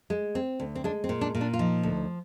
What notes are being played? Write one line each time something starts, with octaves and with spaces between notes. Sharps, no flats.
G#3
C4
D2
C4
G#3 D4
C4
A#2
D4
A#2
D4
F4
F3 D#4
D2